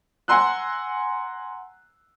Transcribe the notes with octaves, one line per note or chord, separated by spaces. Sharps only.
F#5 G#5 A#5 C6 E6 F#6